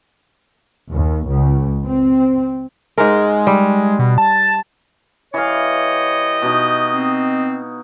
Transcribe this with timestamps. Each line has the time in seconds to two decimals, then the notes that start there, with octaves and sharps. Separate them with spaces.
0.91 D#2
1.28 C#2
1.87 C4
2.98 G#2 G#3 A#4
3.47 G3
3.99 B2
4.18 A5
5.34 E3 G4 C#5 D#5 F5
6.42 B2 D#4
6.93 C4